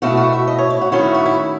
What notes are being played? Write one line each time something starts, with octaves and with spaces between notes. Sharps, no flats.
B2 A3 E4 F#4
F#4
E5
D#5
C#5
E4
F#4
D#3 A3 C#4 E4 F#4
F#4
E4